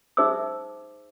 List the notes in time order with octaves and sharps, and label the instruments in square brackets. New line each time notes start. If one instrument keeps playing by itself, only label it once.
[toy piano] D#4 G#4 C5 E5 D6 E6